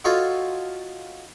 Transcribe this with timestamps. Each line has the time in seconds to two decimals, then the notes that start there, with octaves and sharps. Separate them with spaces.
0.04 D#4 F4 F#4 A4 C#5 F5